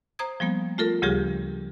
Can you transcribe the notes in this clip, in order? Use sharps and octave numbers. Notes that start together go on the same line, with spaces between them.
C5 A#5 D#6 G#6
F3 G3 A#3 B3
A3 F4 A4 A#4
D2 C#3 F3 G3 G4 G#4